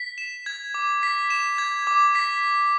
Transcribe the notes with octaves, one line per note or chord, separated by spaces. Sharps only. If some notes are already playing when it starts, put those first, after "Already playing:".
Already playing: B6
E7
G#6
D6
B6
E7
G#6
D6
B6